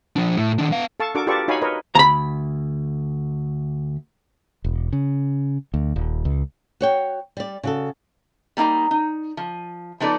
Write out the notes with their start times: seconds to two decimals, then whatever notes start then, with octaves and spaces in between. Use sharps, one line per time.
0.16 F3 D4
0.37 A2
0.59 D#3 D4
0.72 B3 F5
1.00 A4 F5 A5 C#6
1.15 D4 F#4 A4 A#4 C#6 D6
1.27 F4 G4 A4 B4 D5 C#6
1.48 D#4 F#4 C#5 F5 G#5 B5
1.61 A#4 B4 C#5 D#5
1.95 D2 A#5 B5
4.64 E1
4.93 C#3
5.74 D2
5.96 D#1
6.25 C#2
6.81 F#4 C#5 G5
7.37 G3 D5
7.63 C#3 F#4 A4
8.57 G3 A#3 D#4 G5 A#5
8.91 D#4
9.37 F3
10.00 F3 B3 D#4 A4 D5